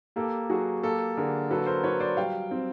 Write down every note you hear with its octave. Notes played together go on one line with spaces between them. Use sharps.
A#3 G4 A4
F#3 F#4 G#4
A#3 G4 A4
D3 G#4 A#4
F#3 A4 B4
A#4 C5
F#3 B4 C#5
C5 D5
G3 F5 G5
C4